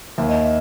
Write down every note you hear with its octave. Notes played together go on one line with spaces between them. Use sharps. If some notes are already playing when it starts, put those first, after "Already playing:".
D#2 E5
D#5
E5